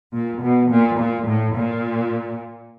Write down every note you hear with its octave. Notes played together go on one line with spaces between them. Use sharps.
A#2
B2
A#2
A#2
A2
A#2